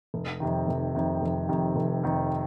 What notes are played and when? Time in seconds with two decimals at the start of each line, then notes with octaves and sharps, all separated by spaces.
0.14 F1
0.40 F2 C3 D#3
0.68 F1
0.95 F2 C3 D#3
1.22 F1
1.49 F2 C3 D#3
1.76 F1
2.03 F2 C3 D#3